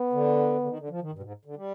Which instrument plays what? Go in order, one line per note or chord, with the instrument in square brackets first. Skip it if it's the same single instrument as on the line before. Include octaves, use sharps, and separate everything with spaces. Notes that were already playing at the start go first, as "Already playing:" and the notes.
Already playing: [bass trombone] B3
[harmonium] D3
D3
D#3
D3
F3
D#3
G2
B2
G#2
D3
G3